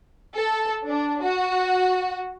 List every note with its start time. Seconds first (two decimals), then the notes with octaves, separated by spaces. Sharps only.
0.34 A4
0.87 D4
1.23 F#4